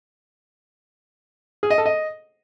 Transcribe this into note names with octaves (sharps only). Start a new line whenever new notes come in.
G#4
D#5
A4
D#5